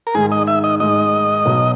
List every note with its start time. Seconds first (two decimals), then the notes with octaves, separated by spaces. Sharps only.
0.07 A#4
0.14 G#2 D#3 G#3 G#4
0.32 D#5
0.47 E5
0.64 D#5
0.80 G#2 D#3 G#3 D#5
1.45 B1 B2 F#3